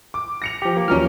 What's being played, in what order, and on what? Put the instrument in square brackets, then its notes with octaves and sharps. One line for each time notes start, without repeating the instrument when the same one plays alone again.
[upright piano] D6
A#6 C#7 F7
[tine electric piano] F3 G4
A#3
[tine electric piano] D#2 A#4 F6 [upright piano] F3 F#3 C#4